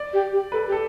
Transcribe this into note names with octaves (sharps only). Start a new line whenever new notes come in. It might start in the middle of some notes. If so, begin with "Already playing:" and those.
Already playing: D5
G4
G4
A4 B4
G4
A4